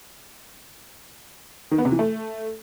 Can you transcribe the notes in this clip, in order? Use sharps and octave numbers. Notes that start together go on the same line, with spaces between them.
D#3
B3
C3
E3
A3